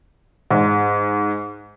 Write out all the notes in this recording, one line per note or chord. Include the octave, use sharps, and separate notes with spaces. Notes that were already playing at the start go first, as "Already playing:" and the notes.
G#2